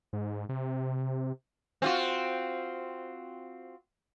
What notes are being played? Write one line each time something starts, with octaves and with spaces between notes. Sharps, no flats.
G#2
C3
C4 F4 F#4